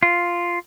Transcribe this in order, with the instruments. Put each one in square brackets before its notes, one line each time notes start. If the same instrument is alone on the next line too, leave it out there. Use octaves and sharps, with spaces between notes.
[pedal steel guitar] F4